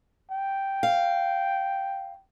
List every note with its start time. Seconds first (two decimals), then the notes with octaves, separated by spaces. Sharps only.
0.31 G5
0.83 F5